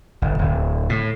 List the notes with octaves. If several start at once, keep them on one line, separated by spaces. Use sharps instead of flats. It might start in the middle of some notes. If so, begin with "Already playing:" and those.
G1
D1
A2